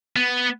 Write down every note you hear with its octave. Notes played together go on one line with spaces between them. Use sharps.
B3